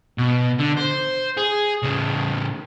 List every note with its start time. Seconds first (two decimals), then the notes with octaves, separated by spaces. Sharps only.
0.18 B2
0.59 D3
0.78 C5
1.37 G#4
1.83 A2 C#3